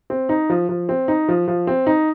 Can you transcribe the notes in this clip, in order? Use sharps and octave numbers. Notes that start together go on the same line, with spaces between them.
C4
D#4
F3
F3
C4
D#4
F3
F3
C4
D#4